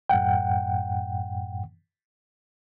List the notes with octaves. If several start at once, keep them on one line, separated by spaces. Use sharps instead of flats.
F#2 A2 F#5 G5